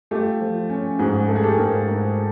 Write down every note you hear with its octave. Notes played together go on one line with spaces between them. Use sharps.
A3 F4 G4
F3
C#4
G#2 F#4 G#4
A3 A4
G#4
G4 A4
G#2 G#4 A#4
G#2